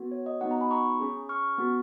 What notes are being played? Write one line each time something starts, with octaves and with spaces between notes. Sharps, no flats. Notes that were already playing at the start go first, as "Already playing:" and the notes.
Already playing: B3 F#4
C#5
D#5
B3 D#4 F#4 D#5 F#5
F#5 A#5
G#5 B5
A#5 C#6
C#4 G#4
C#6 F6
B3 F#4